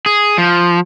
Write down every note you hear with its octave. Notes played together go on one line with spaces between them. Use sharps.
G#4
F3